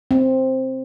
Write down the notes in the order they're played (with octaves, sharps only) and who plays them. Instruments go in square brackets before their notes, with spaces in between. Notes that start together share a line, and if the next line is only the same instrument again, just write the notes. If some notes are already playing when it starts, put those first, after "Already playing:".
[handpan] C4